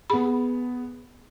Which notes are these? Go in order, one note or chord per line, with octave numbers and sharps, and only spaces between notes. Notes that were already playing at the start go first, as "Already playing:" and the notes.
B3 G#4 B5